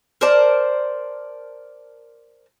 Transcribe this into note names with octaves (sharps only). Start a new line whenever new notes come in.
A#4 C5 D5 A5